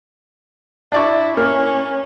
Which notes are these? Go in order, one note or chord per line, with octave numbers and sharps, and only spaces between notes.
D4 E4 D5 C#6
A#3 C#4 F6